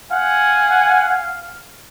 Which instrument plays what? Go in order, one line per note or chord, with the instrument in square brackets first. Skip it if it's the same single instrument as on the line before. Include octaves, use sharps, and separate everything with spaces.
[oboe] F5 [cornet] F#5 [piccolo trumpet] G#5